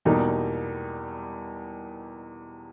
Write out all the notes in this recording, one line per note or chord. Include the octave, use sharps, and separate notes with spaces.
E2 B2 G3 A#3 D#4